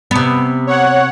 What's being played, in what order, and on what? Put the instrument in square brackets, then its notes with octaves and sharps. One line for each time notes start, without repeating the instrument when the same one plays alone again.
[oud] C3 B3
[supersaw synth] C#5 F#5